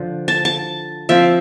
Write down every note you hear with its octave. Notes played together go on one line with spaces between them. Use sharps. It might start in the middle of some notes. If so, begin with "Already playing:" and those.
Already playing: D3 F3
A5
A5
F3 C4 E5